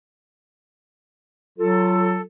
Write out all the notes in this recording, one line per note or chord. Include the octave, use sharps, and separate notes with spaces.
F#3 F4 A4